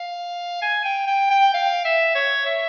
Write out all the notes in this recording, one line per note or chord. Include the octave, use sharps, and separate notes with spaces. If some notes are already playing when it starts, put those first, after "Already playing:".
Already playing: F5
G#5
G5
G5
G5
F5
E5
C#5
E5